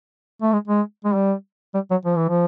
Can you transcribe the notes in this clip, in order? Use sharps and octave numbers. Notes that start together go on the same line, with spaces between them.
A3
G#3
G#3
G#3
G3
G3
F#3
F3
E3
F3